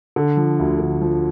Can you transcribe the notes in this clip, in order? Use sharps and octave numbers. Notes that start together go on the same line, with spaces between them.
D3
F3
D2
D3
F3